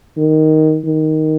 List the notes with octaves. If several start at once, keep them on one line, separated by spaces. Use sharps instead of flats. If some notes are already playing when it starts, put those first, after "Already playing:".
D#3
D#3